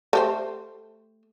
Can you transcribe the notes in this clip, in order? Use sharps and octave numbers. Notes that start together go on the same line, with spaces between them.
A3 G4 C5